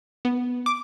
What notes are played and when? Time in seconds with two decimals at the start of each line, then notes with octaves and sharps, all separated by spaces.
0.25 B3
0.66 D6